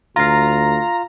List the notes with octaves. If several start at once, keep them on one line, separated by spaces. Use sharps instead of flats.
D2 F4 F5 A#5